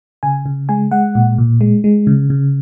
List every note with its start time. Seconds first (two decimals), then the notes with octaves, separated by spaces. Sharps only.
0.23 C#3 G#5
0.46 C#3
0.69 G#3 G#5
0.91 G#3 F#5
1.15 A#2
1.38 A#2
1.61 G#3
1.84 G#3
2.07 C#3
2.30 C#3